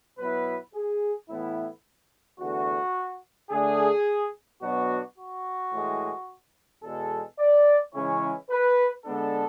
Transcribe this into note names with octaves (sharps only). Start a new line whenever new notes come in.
B2 F#3 B3 E4 B4
G#4
A2 E3 B3 E4
E2 D3 A3 F#4
D3 A3 D4 G#4
B2 F#3 B3 D4 F#4
F#4
A2 E3 G#3
E2 B2 G#3 A4
D5
C#3 E3 G#3 C#4 E4 C#5
B4
D3 G#3 B3 D4 A4